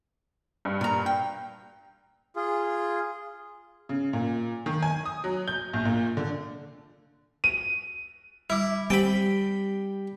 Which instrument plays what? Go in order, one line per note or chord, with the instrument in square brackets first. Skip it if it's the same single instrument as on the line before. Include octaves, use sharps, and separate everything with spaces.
[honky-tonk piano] G2
[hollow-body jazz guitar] A#2 A#5
G5
[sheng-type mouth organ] F4 G#4
[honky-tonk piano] C#3
A#2
D#3
G#5
D#6
F#3
G6
A#1
A#2
D3
[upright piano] D#7
[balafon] G3 D6 [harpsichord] E4
[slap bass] G3 [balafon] C4 G4 C5 [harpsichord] G5 B5